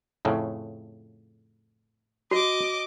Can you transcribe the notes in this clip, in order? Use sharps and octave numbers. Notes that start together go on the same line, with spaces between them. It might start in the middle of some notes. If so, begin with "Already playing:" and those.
F2 A2 C#3
F#4 D#5 D6